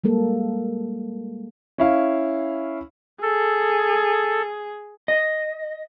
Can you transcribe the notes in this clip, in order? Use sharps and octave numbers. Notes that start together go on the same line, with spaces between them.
G3 G#3 A#3 A4
C#4 E4 F5
G#4 A4
D#5